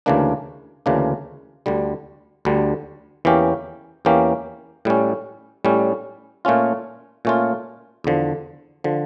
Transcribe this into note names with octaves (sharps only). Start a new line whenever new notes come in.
D2 C#3 E3 A#3 D4
D2 C#3 E3 A#3 D4
D2 D3 G3
D2 D3 G3
E2 E3 A#3 C#4 G4
E2 E3 A#3 C#4 G4
A2 G3 C#4
A2 G3 C#4
A#2 A3 C#4 F4
A#2 A3 C#4 F4
E2 D3 F3
D3 F3